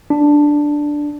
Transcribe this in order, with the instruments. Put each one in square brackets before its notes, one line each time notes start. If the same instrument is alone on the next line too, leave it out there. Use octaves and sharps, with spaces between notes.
[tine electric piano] D4